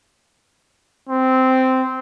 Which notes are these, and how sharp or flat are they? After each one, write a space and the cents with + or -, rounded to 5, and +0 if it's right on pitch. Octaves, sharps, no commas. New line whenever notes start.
C4 -10